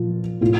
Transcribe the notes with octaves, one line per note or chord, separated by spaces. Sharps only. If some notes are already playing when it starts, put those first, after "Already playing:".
Already playing: A#2 F3 F4
A2 F4